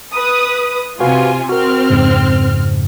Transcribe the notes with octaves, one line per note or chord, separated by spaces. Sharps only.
B4 D#6
C3 F4 F#4 B4 F5 G#5
C4 F#4 A#4 F6
F2 G#2 C#3